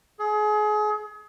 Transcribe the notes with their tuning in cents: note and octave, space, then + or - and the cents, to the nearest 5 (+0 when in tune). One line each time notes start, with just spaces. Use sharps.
G#4 +30